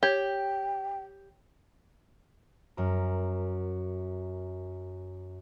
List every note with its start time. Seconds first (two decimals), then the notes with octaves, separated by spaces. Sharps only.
0.03 G4 C#5 G5 G#6
2.77 F#2 A#4